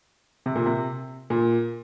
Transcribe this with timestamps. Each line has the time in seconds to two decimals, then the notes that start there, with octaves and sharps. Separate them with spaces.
0.46 C3
0.55 A#2
0.66 C3
1.30 A#2